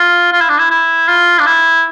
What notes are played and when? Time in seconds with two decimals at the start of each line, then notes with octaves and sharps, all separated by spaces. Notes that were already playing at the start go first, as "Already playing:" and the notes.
Already playing: F4
0.32 F4
0.41 E4
0.49 D4
0.58 E4
0.70 E4
1.08 F4
1.39 D4
1.46 E4